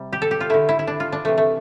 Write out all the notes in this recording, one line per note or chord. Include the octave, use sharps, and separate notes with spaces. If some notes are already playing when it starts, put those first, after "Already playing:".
Already playing: C3 G3
G4
A4
G4
F4
D3 A3 E4
E4
E4
D4
F4
D4
C3 E3 A3
A3